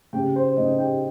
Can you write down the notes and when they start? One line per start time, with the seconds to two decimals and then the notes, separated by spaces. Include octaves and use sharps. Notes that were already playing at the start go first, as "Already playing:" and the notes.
0.13 C#3 G4 G5
0.36 C5
0.57 C#3 D#4 D#5
0.78 G4 G5